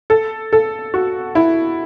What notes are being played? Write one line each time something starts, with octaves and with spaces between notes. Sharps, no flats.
A4
A4
F#4
E4